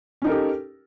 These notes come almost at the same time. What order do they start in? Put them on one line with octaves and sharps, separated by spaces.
C#4 D#4 A#4 A4 G4